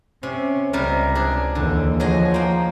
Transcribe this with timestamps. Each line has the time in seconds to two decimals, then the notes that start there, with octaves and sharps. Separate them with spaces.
0.23 C3 C#4
0.73 C#2 C3 G3 A#4
1.15 D4 G#4
1.55 D#2 D3 E3
2.00 F3 F#3 G#4 D#5
2.34 A#3 G5